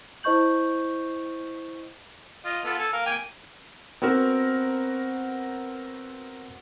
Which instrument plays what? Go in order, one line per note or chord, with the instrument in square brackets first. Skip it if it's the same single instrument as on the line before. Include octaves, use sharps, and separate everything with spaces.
[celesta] E4 C5 D#5 C#6 G6 F#7
[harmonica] F4 D#5
B3 F4 A4
A4 G#5
A#4 F5
A#3 G5 G#5
[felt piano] B3 C4 F#4 A#4